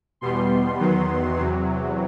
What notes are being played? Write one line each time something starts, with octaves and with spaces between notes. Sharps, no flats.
E2 B2 G3 B3 C6
E2 D#3 F#3 B3
E2 C3 F#3